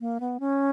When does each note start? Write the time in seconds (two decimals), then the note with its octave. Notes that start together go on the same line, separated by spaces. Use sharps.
0.01 A#3
0.20 B3
0.40 C#4